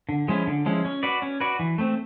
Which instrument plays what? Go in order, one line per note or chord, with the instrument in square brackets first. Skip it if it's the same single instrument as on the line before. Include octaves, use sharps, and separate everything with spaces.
[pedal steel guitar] D3
F3 G#3 C#4 E4
D3
F3 G#3 C#4 E4
C#4
F#4 B4 D5
C#4
F#4 B4 D5
E3
A3 C4